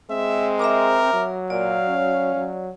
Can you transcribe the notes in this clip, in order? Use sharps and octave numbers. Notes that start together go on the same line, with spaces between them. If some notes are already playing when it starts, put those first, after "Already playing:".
G#3 C4 E5
A#4 E5 A#5 D6
F#3
A#2 D5 F5
C#4
F#3